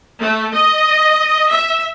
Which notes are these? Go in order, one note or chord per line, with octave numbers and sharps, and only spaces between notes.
A3
D#5
E5